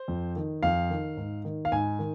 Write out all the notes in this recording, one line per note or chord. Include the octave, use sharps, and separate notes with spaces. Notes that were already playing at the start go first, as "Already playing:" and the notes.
Already playing: C5
F2
D#3
F2 F5
D#3
G#2
D#3
F5
G#2 G#5
D#3